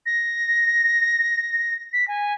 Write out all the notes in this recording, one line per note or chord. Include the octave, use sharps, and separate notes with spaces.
A#6
B6
G#5